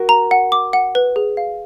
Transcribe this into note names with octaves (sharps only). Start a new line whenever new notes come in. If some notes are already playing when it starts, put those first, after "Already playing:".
Already playing: F#4 A#4
A#5
F#5
D6
F#5
B4
G#4
F5